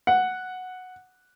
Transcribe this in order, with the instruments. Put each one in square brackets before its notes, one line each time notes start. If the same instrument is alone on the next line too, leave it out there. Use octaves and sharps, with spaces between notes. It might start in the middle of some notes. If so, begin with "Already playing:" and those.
[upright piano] F#5